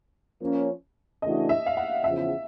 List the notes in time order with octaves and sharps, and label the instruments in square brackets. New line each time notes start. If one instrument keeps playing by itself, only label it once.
[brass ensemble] F3 A#3 C#4
[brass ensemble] C#3 E3 A3 D4 F#4 [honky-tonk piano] D#5
[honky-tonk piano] E5
F5
F#5
[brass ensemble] E2 C#3 F3 [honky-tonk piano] E5